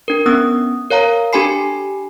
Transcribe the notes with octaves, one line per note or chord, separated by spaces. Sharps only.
D4 A#4
B3 C#4 D#6
A#4 C#5 F5 A#5
D4 G4 A4 G#5 B5 C7